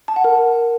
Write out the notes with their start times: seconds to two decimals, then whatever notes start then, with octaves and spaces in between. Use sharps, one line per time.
0.08 A5
0.16 F#5
0.24 A#4